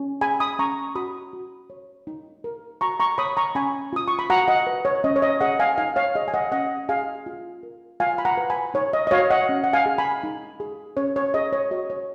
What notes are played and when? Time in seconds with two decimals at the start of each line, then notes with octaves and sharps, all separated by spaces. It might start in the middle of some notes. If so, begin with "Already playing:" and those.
Already playing: C#4
0.21 G#4 G#5 B5
0.40 B5 D#6
0.59 C#4 A#5 C#6
0.95 F#4 B5 D#6
1.33 F#4
1.70 C#5
2.07 D#4
2.44 A#4
2.81 F#4 A#5 C#6
3.00 A#5 C#6
3.18 C#5 B5 D#6
3.37 A#5 C#6
3.55 C#4 G#5 B5
3.93 F4 D#6
4.08 C#6
4.19 B5
4.30 F#4 F#5 A#5
4.48 D#5 F#5
4.67 B4
4.85 C#5
5.04 C#4 D#5
5.16 C#5
5.22 D#5
5.41 G#4 D#5 F#5
5.59 F5 G#5
5.77 D#4 F5 G#5
5.96 C#5 F5
6.15 G#4 D#5
6.28 G#5
6.34 D#5 F#5
6.52 C#4 D#5 F#5
6.89 G#4 F5 G#5
7.26 F4
7.63 A#4
8.00 F4 F5 G#5
8.18 B5
8.25 F#5 A#5
8.37 B4
8.50 G#5 B5
8.74 D#4 C#5
8.93 D#5
9.07 D#5
9.11 F#4 C#5 F5
9.30 D#5 F#5
9.49 C#4
9.64 F#5
9.73 F5 G#5
9.86 G#4
9.98 G#5 B5
10.23 D#4
10.60 G#4
10.97 C#4 C#5
11.16 C#5
11.34 G#4 D#5
11.53 C#5
11.71 F#4 D#5
11.90 C#5